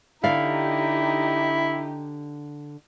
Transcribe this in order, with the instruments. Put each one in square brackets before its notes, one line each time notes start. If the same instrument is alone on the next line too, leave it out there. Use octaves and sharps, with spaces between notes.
[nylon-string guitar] D3 D5 F5 [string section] D#4 G4 [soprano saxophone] E4